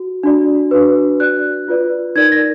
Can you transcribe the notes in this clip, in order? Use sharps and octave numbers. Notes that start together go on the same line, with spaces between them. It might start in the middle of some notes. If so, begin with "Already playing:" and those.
Already playing: F#4
D4 F#4 D5
D4 F#4 B4
F#4 D5 F#6
F4 B4 D5
D#4 A#4 D5 G#6
A#6